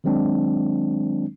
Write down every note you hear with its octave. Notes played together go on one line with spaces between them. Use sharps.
D#3 F#3 G#3 C4 D4